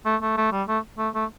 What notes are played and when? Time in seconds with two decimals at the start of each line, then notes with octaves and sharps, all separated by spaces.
0.06 A3
0.22 A3
0.37 A3
0.52 G3
0.68 A3
0.98 A3
1.14 A3